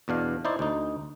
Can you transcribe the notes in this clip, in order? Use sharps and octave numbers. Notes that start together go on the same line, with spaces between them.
E2 B2 D4 F5
D#4 E4 C5 D5
D2 D#4